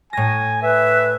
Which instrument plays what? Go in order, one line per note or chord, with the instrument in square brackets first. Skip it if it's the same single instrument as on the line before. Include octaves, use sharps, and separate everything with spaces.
[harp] A2 A#6 [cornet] G#5
[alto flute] B4 [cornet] E5